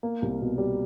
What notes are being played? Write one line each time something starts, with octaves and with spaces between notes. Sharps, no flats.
A#3
C2
B2
G3